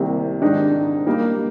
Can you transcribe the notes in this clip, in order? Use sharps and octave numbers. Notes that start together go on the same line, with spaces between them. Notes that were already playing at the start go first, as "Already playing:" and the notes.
Already playing: C2 C3 D#3 A#3
G#2 D#3 G#3 D4 D#4
G3 A#3 D#4